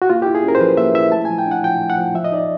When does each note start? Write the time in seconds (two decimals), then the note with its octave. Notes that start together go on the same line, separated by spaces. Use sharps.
0.02 F#4
0.10 A#3 F4
0.22 G4
0.26 E4
0.35 G#4
0.44 C#4 A#4
0.55 C5
0.60 F3 B4
0.77 A#3 E5
0.95 E4 E5
1.12 A3 A5
1.25 G#5
1.30 F3
1.38 G5
1.46 D4
1.51 F#5
1.63 F3 G5
1.81 A3
1.90 F#5
1.98 F3
2.15 F3 E5
2.24 D#5
2.32 D#4 D5